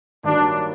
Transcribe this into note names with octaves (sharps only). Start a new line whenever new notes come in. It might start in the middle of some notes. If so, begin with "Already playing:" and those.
G2 D#3 F#3 A#3 D4